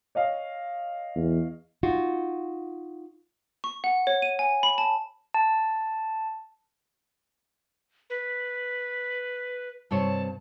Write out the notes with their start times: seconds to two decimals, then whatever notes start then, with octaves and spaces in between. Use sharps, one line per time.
0.15 C#5 D#5 F5
1.15 E2
1.83 D#4 F4 F#4
3.64 C#6
3.84 F#5
4.07 C#5
4.22 D#7
4.39 G#5
4.63 B5
4.78 A5
5.34 A5
8.10 B4
9.91 G2 C3 C#5 A5